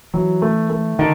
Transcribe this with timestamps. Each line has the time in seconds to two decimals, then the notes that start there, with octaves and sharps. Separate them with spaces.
0.14 E3 F#3
0.42 A3
0.70 A3
0.99 D3 D#3